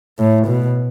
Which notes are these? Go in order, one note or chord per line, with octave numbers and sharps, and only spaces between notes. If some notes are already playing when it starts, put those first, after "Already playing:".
A2
B2